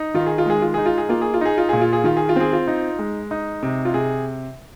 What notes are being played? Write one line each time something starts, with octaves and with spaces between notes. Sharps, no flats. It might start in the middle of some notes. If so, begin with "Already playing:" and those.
Already playing: D#4
D#3 F4
G#4
F4
G#3 G#4
F4
D#4 G#4
F4
G#4
A#3 F4
G#4
F4
D#4 G#4
F4
A#2 G#4
F4
G#4
D#3 F4
G#4
F4
C4 G#4
F4
D#4
G#3
D#4
C3
F4
C3 G#4